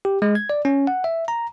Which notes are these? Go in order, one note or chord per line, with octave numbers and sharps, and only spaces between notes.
G4
G#3
G#6
D5
C#4
F#5
E5
A#5